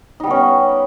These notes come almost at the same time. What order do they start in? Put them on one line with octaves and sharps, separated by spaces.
D#4 G3 B3 C#4